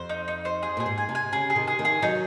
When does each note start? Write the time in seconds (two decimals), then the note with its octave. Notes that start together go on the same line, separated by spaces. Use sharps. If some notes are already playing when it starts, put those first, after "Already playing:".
Already playing: F2 C5
0.09 D#4
0.28 D#4
0.45 C5
0.63 G#4
0.77 A#2 G#4
0.86 G#2
0.98 G#5
1.09 C3
1.15 G#5
1.33 C#3 G#4
1.50 G#4
1.56 C3 D#3
1.67 G#4
1.79 C3 D#3
1.85 G#4
2.02 D#3 F#3 D#4